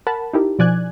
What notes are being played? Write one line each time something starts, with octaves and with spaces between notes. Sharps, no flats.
A#4 F#5 A5 B5
D#4 E4 G4 A#4
B2 F3 D5 G#5 F#6 G#6